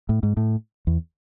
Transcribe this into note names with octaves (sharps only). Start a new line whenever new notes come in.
A2
G#2
A2
E2